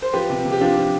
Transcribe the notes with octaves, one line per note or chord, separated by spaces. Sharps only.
C5
F3 G4 B4
C3
C3
G4
F3 D4 F4
F3